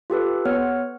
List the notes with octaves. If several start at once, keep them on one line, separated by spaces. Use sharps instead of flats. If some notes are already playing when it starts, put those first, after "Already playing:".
F4 G4 A4 B4
B3 C#5 F#5 F6